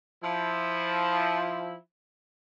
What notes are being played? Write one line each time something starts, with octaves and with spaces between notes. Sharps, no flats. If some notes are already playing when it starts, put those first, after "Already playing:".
F3 E4